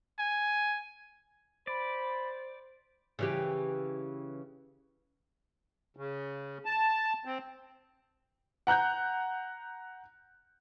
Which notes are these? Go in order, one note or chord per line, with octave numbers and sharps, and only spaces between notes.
G#5
C5 D5 B5
C#3 E3 G4
C#3
A5
C4
F#5 A#5 F#6 G6